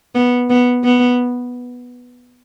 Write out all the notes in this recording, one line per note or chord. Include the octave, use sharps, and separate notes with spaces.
B3
B3
B3